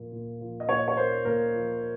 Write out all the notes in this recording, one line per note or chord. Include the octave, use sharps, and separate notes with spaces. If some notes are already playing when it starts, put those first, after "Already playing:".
Already playing: A#2 F3 A#3
A#2
F3
D#5
A#2 C#5
C#5
A#3 C5
A#2 A#4
F3